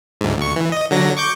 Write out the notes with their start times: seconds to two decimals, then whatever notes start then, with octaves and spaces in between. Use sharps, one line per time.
0.21 D2 G#2
0.38 D2 C#6
0.56 E3
0.72 D#5
0.91 D3 F#3 A#6
1.17 C#6 D6 G6